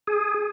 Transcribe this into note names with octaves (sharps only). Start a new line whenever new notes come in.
G#4